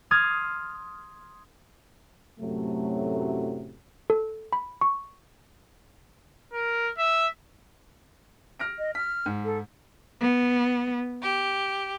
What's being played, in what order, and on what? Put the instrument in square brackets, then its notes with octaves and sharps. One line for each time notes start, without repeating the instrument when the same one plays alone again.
[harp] C6 D#6 F6 G#6 A6
[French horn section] F#2 A2 C3 F#3 A3
[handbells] A4
B5
C#6
[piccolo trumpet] A#4
E5
[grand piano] F6 A#6 D7
[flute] D#5
[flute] F6 [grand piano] B6
[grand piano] G#2
[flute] A4
[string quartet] B3
G4